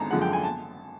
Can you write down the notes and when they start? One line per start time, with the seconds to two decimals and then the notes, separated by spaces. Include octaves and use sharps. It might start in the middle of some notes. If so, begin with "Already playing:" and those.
Already playing: G#1 D3 G#3 A5 A#5
0.11 F#2 D3 F3 G#3 F#5
0.22 G5
0.33 G#5
0.43 A5